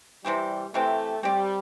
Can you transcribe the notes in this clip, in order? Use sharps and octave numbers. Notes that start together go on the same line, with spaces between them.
C3 E3 G3 C4 G4
C3 E3 A3 C4 G4
G3 C4 G4 D5